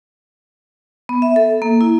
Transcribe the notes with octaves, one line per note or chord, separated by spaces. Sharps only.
B3
E5
A4
A#3
E4